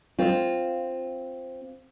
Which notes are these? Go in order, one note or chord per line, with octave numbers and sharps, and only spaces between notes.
C4 F4